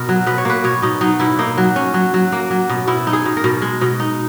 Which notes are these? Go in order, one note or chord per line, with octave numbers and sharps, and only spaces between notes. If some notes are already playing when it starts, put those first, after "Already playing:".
Already playing: B2 A#4
F#3
B2 B4
C#5
A#3 B4
B2 C#5
B2 D#4
F#3 D#4
B2 E4
A#3 D#4
F#3
C#4
F#3
F#3
A#3
F#3
B2
B2 E4
D#4
G#4
B2
A#4
B2
G#3
B2
D#4